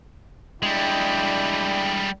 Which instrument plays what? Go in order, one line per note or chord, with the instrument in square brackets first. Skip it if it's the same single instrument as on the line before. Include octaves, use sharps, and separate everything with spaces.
[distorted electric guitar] G3 G#3 [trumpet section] D4 E4 G5